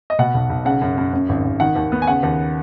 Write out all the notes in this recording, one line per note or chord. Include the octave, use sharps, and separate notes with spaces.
D#5
B2 F#5
B1
B1
C#3 F#5
F#2
F#2
F#2
G#1
G#1
D#3 F#5
D#2
B3
G#5
C#3 F#5
D#2